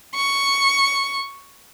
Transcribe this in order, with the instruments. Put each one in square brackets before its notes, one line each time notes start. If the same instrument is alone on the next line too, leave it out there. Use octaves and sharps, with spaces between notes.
[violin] C#6